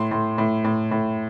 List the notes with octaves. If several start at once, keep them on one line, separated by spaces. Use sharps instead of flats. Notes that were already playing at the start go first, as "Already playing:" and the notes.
Already playing: A2 C6
A2
A2
A2
A2